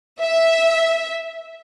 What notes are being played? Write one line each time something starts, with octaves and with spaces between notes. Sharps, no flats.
E5